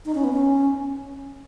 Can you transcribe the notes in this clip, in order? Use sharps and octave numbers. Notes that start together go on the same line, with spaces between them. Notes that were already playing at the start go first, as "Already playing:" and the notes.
D#4
C#4
B3
C#4